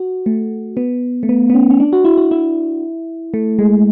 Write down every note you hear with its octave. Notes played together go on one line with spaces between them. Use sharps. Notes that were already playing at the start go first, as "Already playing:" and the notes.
Already playing: F#4
A3
B3
A3
B3
B3
C#4
C#4
D4
F#4
E4
F#4
E4
A3
G#3